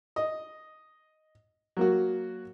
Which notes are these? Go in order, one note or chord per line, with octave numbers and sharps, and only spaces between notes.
D#5
F#3 A#3 F#4